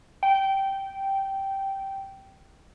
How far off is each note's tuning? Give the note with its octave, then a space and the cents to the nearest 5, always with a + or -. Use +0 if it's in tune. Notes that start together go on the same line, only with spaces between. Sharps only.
G5 -10